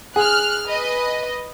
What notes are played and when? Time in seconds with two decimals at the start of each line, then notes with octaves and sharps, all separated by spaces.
0.16 G#4 F6 F#6
0.67 B4 D#5